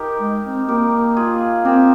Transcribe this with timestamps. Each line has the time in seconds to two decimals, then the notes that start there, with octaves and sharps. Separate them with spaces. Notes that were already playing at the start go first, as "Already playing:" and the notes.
Already playing: D#4 G4 A#4
0.20 G#3
0.45 C4
0.68 A#3 G4 A#4
1.17 F4 G#4
1.65 C4 G4 A#4